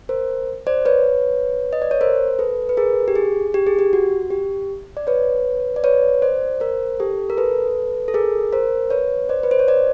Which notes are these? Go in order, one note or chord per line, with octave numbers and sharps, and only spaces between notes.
A#4 C5
C5 D5
B4 C#5
D#5
D5
C#5
A#4 C5
A4 B4
B4
G#4 A#4
G4
G#4
G4
G#4
G4
F#4
G4
D5
B4 C#5
D5
B4 C#5
C5 D5
A#4 C5
G4 A4
A#4
A4 B4
A4
G#4 A#4
A#4 C5
B4 C#5
C5 D5
B4
C5
C#5
C5 D5